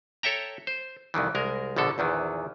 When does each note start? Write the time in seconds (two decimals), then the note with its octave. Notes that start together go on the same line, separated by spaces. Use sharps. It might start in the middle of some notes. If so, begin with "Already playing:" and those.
0.23 A4 C#5 E5 G5 A#5
0.67 C5
1.14 C2 F2 D#3 E3
1.35 C2 G#3 A#4
1.76 A#1 B2 D3 A4
1.98 A#1 E2 D#3 E3